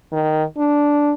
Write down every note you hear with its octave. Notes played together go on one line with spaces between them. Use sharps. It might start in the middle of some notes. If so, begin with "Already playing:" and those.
D#3
D4